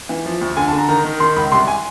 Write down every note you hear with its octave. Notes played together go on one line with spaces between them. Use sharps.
E3
F3
D2
D3 G#5
A5
D3
A#5
D#3 A#5
D#3
D#3 C6
C#2 B5
C2 C6
G#5